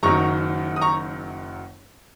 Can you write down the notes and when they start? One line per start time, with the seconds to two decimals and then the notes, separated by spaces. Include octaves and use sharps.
0.03 F#1 F#2 D#3 F#3 A#5 C#6
0.76 D#6
0.81 A#5 C#6